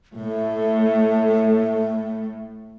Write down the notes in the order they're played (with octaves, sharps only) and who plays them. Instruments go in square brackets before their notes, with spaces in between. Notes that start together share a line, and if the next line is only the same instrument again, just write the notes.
[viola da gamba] A2 [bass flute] A3